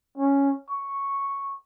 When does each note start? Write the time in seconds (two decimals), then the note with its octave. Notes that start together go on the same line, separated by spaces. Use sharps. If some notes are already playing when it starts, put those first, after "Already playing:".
0.18 C#4
0.70 C#6